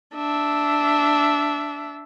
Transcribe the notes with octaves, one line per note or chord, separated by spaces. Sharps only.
D4 E5